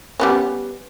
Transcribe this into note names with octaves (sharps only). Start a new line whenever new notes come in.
G3 B3 C#4